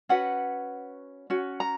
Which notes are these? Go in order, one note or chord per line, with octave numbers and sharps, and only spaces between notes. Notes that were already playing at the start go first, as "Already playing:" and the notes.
C#4 F#4 B4 F#5
C#4 F#4
A#5